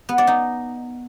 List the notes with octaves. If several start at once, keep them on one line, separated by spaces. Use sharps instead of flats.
B3
D5
D#4